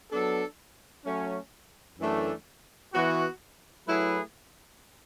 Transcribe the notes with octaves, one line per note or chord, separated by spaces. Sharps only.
F#3 B3 D4 A4
F#3 A3 C#4
F#2 E3 A3 D4
E3 B3 F#4
F#3 A3 E4 G#4 B4